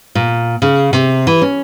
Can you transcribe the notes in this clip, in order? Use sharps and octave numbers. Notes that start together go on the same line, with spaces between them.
A#2
C#3
C3
E3
C#4